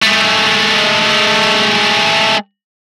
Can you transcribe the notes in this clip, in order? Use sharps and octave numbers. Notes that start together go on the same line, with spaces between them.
G#3 A3